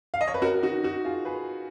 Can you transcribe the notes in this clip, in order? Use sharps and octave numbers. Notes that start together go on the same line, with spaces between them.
F5
D#5
C#5
B4
F#4 A#4
D#4 F#4
D#4 F#4
F4 G#4
G#4 B4